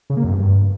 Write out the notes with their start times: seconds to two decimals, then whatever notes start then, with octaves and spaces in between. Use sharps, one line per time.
0.10 C#3
0.17 A#3
0.24 F#2
0.31 G2